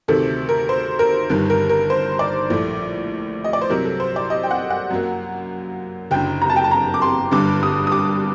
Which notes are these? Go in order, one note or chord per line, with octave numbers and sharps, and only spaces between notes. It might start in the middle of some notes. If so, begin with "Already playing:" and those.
D2 C3 D#3 A3 A4
A#4
C5
A#4
G1 G2 D#3
A#4
A#4
C5
D5
A#1 A2 A3
D#5
D5
C5
C2 C3 F#3 A#4
A4
C5
D5
D#5
G5
F#5
F#5
F#2 F#3 A#3
F#1 F#2 D3 G5
A#5
A5
G5
A5
A#5
D6
C6
G1 G2 D3 D6
D#6
D#6
D6